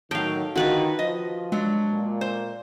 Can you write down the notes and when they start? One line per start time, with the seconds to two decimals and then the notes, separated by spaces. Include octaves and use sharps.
0.11 A2 D#3 F#3 F5 G5
0.56 D3 D#3 F4 F#4 B4
0.99 F3 D#5
1.52 F#3 G#3 D4
1.91 A#2
2.21 C5